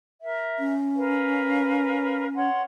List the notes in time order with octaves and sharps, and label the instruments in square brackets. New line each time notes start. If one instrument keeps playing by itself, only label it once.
[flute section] A#4 E5
[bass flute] C#4
[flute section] A#4 B4 F5
C#5 F#5 C6